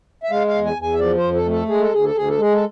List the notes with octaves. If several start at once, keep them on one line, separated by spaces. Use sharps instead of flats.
E5
G#3 F5
F5
E2
G#5
E2
G#5
E5
F3 D5
C5
F2
A4
A3
A4
G#3 G#4
A4
D2 G#4
A4
D2 G#4
A4
G#3 G#4
A4